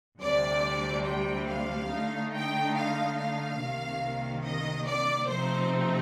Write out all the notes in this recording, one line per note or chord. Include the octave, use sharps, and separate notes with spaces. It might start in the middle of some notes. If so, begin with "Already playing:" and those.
D2 C3 G3 D5
G5
F5
D3 A3 D#4
G5
F5
F5
C2 C3 D#3 A#3
D#5
D5
C3 F3 A3 C4 D#4 C5